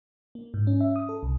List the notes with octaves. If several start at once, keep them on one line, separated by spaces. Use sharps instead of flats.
A#3
G#2
C#4
E5
D#6
A4
C2